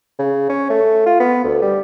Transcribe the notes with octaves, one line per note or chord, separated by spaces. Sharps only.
C#3
C#4
A3
F4
B3
D2
G3